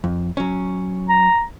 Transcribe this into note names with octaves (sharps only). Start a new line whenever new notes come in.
F2
F#3 C#4
A#5